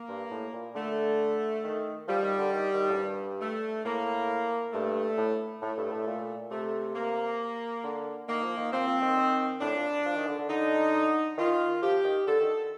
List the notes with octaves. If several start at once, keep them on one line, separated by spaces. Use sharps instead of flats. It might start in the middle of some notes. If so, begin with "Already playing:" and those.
Already playing: A#3
G2
A2
A#2
D3 A3
D#3
F3 G3
D#3
D3
D#3
D#3
A2
G2
A3
A2 A#3
G2 A3
A2
A2 A3
G2
A2
A#2
C3 A3
A#3
D3
D#3 A#3
F3
D#3
F3 C4
F3
D#3
D#3
A2 D4
A#2
F3
D#3
D3
D3
D3 D#4
D#3 F4
F3 G4
D#3
D3 A4
D#3